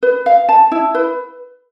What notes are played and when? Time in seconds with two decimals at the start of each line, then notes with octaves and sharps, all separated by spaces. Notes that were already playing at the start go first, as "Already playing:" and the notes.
0.03 B4
0.26 F5
0.49 A5
0.72 E4
0.95 B4